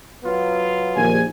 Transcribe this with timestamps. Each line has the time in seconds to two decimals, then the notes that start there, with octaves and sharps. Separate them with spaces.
0.23 F#3 B3 F4
0.96 A#1 D#2 G#5